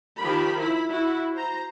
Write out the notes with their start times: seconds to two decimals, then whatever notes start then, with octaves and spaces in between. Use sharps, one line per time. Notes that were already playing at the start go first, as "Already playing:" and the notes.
0.18 D#3 F3 G4 A#4 B5
0.59 E4 B5
0.89 E4 F#4
1.35 C5 A#5